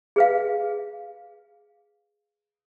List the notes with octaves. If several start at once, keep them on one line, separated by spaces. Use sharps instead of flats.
G#4 B4 F5